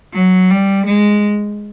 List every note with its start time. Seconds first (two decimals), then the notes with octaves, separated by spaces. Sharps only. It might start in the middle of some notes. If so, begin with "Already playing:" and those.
0.14 F#3
0.50 G3
0.86 G#3